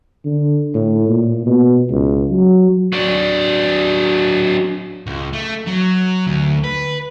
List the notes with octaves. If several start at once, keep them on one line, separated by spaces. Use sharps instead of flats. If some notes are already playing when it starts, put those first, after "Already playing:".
D3
A2
A#2
B2
C#2
F#3
F#3 D4
C#2
A3
F#3
D2
B4